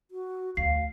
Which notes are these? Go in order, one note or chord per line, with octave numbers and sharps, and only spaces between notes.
F#4
D2 F5 C7